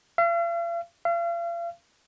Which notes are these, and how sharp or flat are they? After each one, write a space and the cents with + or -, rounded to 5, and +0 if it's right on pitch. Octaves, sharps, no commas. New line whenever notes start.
F5 -45
F5 -40